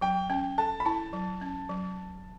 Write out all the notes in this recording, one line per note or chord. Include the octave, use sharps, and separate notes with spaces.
F#3 G5
C#4 G5
A4 A5
B5
E4 A5
F#3
C#4
F#3